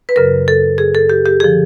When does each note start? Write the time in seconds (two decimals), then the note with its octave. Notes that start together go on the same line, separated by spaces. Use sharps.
0.09 B4
0.16 F#2 C#3 F#3 A#4
0.48 A4
0.78 G#4
0.95 A4
1.10 G4
1.26 G4
1.40 D3 F3 G#4